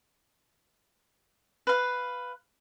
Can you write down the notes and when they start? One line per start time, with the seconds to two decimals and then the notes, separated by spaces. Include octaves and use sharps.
1.67 B4 F5